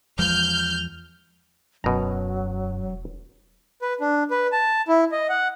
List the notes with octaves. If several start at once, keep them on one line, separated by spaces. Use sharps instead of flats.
E2 F3 G#3 F6 G6
E1 F#2 B2 F#3 A#5
B4
D4
B4
A5
E4
D#5
F#5